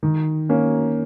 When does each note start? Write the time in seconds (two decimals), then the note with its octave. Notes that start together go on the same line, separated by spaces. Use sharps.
0.03 D#3
0.49 A#3 C#4